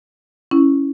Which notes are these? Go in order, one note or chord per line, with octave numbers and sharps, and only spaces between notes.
C#4 E4